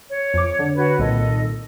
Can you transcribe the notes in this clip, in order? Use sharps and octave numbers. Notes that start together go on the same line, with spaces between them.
C#5
F2 D6
D3
F#4 B4 C#5
C2 A#2 D#3 A4 D#5